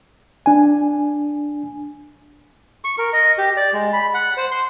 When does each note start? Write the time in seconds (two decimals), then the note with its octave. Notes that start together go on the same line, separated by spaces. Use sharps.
0.46 D4 G#5
2.84 C#6
2.98 A#4
3.13 D#5
3.38 G4
3.57 D5
3.73 G#3
3.93 B5
4.14 F#5
4.37 C5
4.51 C6